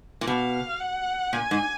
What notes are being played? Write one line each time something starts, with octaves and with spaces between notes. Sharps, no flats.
A#2
B2 F5
F#5
A#2 G#5
G#2